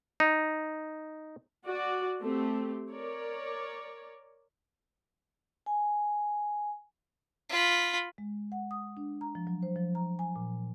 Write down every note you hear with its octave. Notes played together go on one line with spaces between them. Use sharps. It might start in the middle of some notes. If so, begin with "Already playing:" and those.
D#4
F#4 D5
A3 C4 G4
A#4 C#5 D5
G#5
F4 B5
G#3
F#5
D#6
D4
A#5
F3
F#3
C5
F3
A#5
G#5
A#2